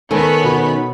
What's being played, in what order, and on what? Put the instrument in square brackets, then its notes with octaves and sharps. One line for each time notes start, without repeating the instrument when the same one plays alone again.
[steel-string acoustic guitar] D#3 A3 C#4 [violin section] B3 C#5 B5 [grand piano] A4
[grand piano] B2